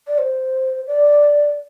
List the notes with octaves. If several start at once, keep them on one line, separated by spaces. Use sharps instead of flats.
D5
C5
D5